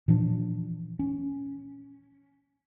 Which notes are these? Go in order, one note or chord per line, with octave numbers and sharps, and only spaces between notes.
A#2 E3 F3 D4
C#4